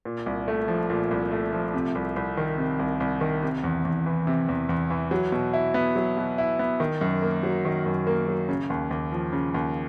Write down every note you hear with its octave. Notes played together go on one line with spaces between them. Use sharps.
A#2
C2
A3
F3
A#2
C2
A3
F3
C3
C2
C2
D#3
C3
C2
C2
D#3
C3
E2
E2
E3
C3
E2
E2
E3
F#3
B2
E4
B3
F#3
B2
E4
B3
D#3
F#2
A#3
F#3
D#3
F#2
A#3
F#3
C#3
D#2
D#2
F3
C#3
D#2